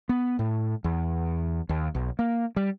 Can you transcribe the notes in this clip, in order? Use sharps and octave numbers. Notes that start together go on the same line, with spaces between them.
B3
A2
E2
D#2
B1
A#3
G3